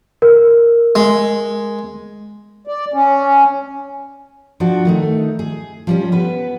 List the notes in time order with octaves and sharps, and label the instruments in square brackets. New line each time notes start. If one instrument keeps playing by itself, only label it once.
[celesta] A#4
[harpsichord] G#3
[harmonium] D5
C#4
[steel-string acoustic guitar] F3 D4 F#4
D#3 A3 D#4
G#4
F3 G3 C#4
B3 B4